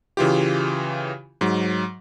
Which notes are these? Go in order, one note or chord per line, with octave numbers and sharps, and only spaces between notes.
C#3 E3 F4 G4
G#2 F#3